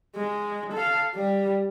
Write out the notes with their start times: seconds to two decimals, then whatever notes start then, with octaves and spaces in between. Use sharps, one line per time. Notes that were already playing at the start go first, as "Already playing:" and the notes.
0.16 G#3
0.73 A4 F5
1.15 G3